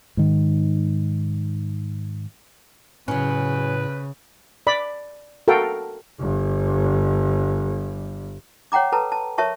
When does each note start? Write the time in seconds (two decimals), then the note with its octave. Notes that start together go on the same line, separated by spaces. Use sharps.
0.17 G#2 D#3
3.08 A2 C#3 F#3 C#4 B4
4.67 D5 B5
5.48 F#4 A4 A#4 F5 G5
6.20 G1 G2
8.72 C#5 F#5 G5 A#5 D6
8.92 A4 B4 A5 A#5
9.12 A5
9.38 A#4 C#5 E5 A5 C#6